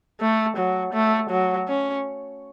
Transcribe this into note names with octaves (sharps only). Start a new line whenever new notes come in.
A3
F#3
A3
F#3
C#4